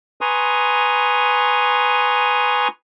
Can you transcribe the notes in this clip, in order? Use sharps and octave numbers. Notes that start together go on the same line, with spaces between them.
B4 G#5 A#5 C6 C#6 D#6